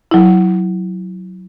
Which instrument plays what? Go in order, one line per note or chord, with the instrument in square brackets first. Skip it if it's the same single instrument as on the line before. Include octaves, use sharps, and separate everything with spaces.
[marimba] F#3 E4